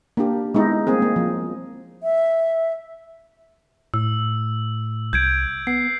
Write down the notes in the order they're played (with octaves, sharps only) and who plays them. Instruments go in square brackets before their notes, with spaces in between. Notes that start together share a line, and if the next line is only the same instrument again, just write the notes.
[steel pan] A#3 D4 G4
G#3 B3 D#4 E4
G3 A#3 C4 G#4
G#3 A#3
F3
[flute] E5
[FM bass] A2 [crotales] E6
[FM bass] C2 [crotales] G6 G#6 D7
[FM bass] B3 [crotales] C7